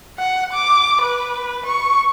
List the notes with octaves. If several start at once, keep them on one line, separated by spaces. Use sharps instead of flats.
F#5
D6
B4
C#6